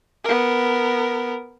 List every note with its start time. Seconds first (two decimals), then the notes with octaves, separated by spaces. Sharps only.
0.25 B3 A#4